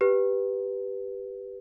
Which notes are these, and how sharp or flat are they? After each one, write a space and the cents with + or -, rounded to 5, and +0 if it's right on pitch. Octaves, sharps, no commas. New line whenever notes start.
G4 +0 B4 +0